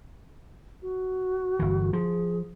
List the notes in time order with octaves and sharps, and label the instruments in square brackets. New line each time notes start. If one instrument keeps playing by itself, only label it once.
[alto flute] F#4
[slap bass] G1 E3
[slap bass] F3 [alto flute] G#4